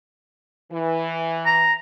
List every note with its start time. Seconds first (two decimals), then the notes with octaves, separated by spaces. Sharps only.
0.71 E3
1.46 A#5